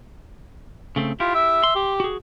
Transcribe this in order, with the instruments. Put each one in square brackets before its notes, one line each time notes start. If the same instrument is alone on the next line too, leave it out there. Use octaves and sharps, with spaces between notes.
[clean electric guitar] C#3 A3 C4
[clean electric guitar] E4 G4 [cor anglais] F4
[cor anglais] E5
[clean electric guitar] C6
[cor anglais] G4
[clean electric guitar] F#4 G#4